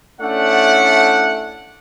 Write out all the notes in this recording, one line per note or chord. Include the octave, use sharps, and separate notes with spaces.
A3 C#4 D4 E4 D5 F#5